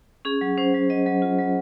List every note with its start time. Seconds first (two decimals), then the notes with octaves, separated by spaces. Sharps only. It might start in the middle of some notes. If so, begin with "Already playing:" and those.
0.25 C#4 G#4
0.41 F#3
0.58 C#4 C5
0.74 F#3
0.90 F#3 D#5
1.06 F#3
1.22 F4
1.39 F#3